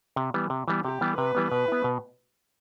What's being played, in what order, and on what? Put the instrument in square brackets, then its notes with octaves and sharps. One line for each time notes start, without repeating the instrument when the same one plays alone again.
[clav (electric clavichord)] C3
E3 G3 B3
C3
E3 G3 B3
[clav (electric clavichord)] C3 [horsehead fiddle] G4
[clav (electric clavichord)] E3 G3 B3
[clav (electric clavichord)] C3 [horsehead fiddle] B4
[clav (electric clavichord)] E3 G3 B3
[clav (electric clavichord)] B2 [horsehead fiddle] B4
[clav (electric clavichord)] B3 E4
B2